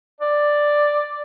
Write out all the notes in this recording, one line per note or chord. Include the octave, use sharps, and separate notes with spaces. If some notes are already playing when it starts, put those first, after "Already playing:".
D5